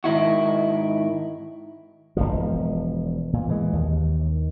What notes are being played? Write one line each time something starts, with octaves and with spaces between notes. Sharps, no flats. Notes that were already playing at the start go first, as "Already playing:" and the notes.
G#2 D#3 E4 F#4
E1 B1 F3
A#2
E3 G#3
D#2